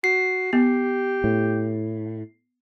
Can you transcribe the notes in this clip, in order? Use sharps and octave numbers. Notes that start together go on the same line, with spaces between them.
F#4 C7
B3 G4
A2